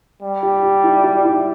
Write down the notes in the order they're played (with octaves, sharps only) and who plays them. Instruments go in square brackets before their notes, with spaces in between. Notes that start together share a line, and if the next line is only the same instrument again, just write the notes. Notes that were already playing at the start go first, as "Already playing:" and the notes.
[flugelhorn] G3
[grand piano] G4
G4
E4
F#4
E4